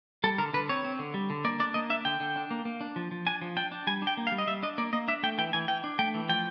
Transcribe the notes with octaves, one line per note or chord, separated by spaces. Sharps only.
G3 A4
D3 A#4
D3 B4
C4 C#5
C4
D3
G3
D3
A#3 D5
D4 D5
A#3 D#5
D4 E5
D3 G5
D3
D4
A#3
A#3
D4
F3
F3
D4 G#5
F3
D4 G5
D4
G3 G#5
D4
G5
A#3
F5
G3
D#5
G3 E5
D4 D#5
A#3 D5
A#3 D#5
D4 E5
A3 G5
E3 G5
E3 G#5
E3 G5
D4
A3 G5
E3
F3 G5